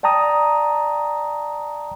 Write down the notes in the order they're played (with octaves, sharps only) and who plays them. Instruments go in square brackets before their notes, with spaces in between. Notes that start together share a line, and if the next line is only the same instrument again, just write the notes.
[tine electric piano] D5 G5 A5 A#5 D#6